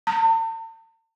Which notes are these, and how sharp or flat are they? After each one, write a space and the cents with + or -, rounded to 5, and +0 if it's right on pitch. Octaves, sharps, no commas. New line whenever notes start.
A5 +45